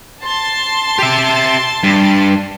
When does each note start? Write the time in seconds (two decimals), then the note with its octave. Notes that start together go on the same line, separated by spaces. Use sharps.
0.22 A5 C6 A6
0.99 G4 E5
1.83 G2